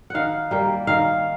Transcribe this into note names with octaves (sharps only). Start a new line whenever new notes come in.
D#3 F5 F#5
G3 A#3
D#3 F5